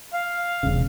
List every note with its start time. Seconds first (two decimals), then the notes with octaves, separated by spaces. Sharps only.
0.13 F5
0.63 E1 C2 C#3